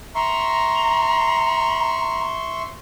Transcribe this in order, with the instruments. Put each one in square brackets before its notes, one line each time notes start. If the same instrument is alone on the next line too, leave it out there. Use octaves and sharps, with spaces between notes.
[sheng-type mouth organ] E5 C6 C#6 [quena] A#5